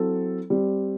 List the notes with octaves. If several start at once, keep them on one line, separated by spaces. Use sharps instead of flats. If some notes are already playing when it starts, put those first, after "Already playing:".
Already playing: F#3 C4 E4 A4
G3 C4 G4